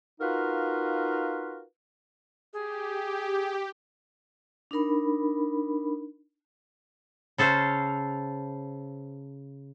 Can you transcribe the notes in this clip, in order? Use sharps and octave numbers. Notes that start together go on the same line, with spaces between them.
D#4 F4 F#4 A#4 B4 F5
G4 G#4
D4 D#4 A#4 B5
C#3 A4 C5 F5